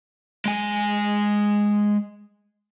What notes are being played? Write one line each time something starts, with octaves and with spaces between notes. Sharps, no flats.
G#3 G#5